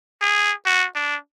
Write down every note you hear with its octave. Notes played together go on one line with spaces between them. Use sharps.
G#4
F#4
D4